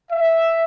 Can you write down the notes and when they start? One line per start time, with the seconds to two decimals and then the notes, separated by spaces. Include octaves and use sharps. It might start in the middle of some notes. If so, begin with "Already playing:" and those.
0.11 E5